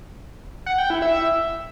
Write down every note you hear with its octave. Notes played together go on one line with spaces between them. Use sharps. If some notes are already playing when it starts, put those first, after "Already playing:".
F#5
G5
E4
E5